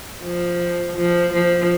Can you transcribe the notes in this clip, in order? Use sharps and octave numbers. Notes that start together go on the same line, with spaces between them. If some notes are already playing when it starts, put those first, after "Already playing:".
F3
F3
F3